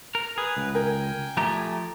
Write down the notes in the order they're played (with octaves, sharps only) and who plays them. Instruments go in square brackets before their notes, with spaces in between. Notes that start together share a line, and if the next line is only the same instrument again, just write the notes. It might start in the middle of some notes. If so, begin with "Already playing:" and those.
[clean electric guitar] A#4
[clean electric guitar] G#4 [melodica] B4
[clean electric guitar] C#2
[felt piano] A#4 [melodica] G5 G#5
[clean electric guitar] F3 A3 G4 [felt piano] A#5